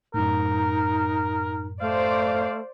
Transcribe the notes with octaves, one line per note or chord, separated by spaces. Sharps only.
F#2 A2 D#4 A#4
A3 C5 D5 F5